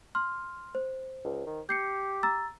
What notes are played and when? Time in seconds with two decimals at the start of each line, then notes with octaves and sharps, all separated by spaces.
0.15 C6 F6
0.75 C5
1.24 C#2
1.46 D#3
1.69 G4 G6 C7 C#7
2.23 A#5 E6 A6